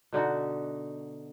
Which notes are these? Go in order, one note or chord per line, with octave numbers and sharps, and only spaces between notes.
B2 D3 D#4 F#4